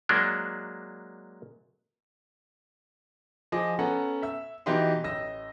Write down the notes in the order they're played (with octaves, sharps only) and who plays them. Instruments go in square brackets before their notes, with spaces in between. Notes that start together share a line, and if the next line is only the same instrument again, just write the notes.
[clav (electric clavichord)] F#3 G#3 A#3 D4
[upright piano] F3 G#4 D#5 D6
B3 C#4 A4 F#5 A#5
E5 E6
B2 E3 D#4 G4 D#5 C6
A1 D#5 E6 A#6